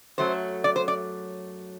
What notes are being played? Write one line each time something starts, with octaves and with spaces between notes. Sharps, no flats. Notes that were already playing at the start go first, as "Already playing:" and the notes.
F#2 F#3 A3 C5
D5
C5
D5